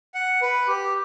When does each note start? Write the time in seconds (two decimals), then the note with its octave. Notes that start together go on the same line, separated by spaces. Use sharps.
0.14 F#5
0.42 B4
0.68 G4